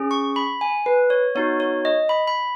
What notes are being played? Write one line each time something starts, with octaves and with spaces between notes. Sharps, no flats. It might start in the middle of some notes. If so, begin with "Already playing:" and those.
Already playing: C#4 G#4
C#6
B5
G#5
B4
C#5
B3 D#4 F#4 C#5
C#5
D#5
B5
B5